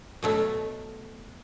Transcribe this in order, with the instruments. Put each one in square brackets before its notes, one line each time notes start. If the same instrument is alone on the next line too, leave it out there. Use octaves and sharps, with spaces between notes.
[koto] B2 F#3 A3